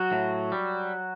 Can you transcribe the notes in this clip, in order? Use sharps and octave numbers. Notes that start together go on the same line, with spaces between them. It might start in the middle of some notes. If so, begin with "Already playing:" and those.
Already playing: F#3 F#4
A2
G3